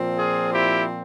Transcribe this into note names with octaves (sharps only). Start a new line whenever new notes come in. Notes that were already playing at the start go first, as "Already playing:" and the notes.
Already playing: A#2 F3 C4
F4 G#4
E4 G4